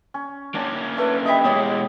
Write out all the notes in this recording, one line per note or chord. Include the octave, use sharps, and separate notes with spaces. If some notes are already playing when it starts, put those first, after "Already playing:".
C#4
A#3 C#4 D4
A3 B4
G3 D#5 E5
B2 G#3 C#5 D#5 D6